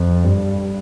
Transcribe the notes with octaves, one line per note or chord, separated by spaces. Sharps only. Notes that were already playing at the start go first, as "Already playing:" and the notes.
Already playing: F2
G2